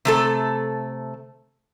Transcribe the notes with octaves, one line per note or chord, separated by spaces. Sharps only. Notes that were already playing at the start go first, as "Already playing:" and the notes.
C3 A3 A4